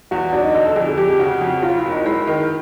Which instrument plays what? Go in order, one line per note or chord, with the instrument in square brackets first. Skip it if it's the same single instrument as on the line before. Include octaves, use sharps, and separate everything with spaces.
[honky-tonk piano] E2 [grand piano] F#4
[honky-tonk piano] F#3 [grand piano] D4
[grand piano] D#4
[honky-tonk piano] D3 [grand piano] D#4
[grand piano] A4
[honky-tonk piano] F2 [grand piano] G#4
[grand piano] G#4
[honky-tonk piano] F2 [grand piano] G4
[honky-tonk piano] C#3 [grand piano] F#4
[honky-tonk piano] F2
[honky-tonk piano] F#3 [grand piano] F4
[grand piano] E4
[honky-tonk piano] F#1
[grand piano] D#4
[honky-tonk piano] G#3 [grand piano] E4
[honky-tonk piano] D#3